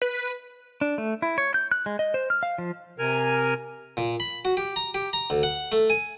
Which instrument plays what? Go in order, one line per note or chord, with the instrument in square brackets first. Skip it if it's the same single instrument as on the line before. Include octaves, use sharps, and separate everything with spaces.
[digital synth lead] B4
[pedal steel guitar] D4
A3
E4
C#5
G6
F#6
G#3
D#5
C5
F6
F5
F3
[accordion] C3 A#4 G#5 F6
[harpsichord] A#2
B5
F#4
G4
A#5
G4
A#5
D2
F#5
A3
G#5